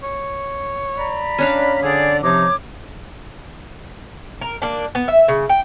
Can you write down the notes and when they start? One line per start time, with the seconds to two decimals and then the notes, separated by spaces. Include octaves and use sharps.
0.03 C#5
0.98 D5 A#5 B5
1.38 C#4 D4 F5
1.83 D3 G#4 D5
2.23 C3 F3 D#4 C#5 D6
4.41 A#4
4.62 A#3 D4
4.95 B3
5.08 E5
5.28 C#3
5.49 G5